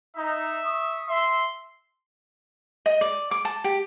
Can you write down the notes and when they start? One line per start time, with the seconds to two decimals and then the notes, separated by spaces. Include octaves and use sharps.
0.17 D#4 E5
0.63 C#6 D#6
1.08 E5 C6
2.86 D#5
3.01 D5
3.31 D6
3.45 A5
3.64 G4